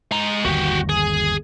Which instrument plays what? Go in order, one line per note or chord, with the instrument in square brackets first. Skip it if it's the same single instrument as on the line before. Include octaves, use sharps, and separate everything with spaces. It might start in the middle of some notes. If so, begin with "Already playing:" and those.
[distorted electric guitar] G#3 A#5
[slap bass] G1 D#2 [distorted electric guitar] F#4 G4
[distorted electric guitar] G#4